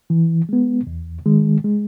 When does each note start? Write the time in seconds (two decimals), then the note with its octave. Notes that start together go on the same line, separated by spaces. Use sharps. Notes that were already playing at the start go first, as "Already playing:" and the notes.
0.10 E3
0.49 G#3 B3
0.87 E2
1.26 D#3 G#3
1.64 G#3